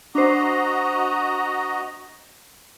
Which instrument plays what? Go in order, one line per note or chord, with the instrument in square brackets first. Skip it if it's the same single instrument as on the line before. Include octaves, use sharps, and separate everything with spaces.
[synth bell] D4 C5 [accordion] F#4 D#5 A#5